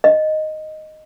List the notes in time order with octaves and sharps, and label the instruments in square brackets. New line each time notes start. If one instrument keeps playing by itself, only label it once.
[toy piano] D#5